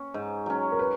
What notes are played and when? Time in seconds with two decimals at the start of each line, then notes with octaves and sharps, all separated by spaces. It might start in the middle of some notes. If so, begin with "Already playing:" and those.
Already playing: C#4
0.14 G#2
0.46 F#3 C#4
0.72 A#4
0.79 B4